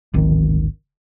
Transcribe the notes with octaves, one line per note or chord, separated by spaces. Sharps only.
D1 G#1 D#3